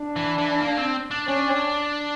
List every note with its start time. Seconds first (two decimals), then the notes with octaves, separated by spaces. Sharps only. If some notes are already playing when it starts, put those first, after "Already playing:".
Already playing: D4
0.16 E3
0.38 E3
0.61 A#3
0.77 C4
1.11 D4
1.28 C#4 D4